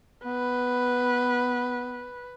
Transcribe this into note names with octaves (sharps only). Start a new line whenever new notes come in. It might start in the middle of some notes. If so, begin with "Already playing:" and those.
B3 B4